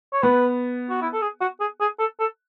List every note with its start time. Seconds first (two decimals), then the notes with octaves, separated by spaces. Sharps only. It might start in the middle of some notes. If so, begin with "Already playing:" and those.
0.13 C#5
0.22 B3 B4
0.90 F#4
1.02 E4
1.13 A4
1.21 G#4
1.41 F#4
1.60 G#4
1.80 G#4
1.99 A4
2.20 A4